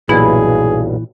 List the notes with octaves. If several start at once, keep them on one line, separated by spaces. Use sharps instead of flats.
B1 G2 A#2 E3 E4 G#4